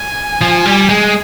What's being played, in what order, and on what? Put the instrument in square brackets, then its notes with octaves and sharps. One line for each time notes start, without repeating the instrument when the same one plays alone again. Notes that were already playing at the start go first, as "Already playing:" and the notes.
Already playing: [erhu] G#5
[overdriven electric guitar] F3
G3
G#3